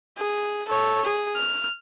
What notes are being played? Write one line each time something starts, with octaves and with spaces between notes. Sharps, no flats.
G#4
A4 C#5
G#4
F6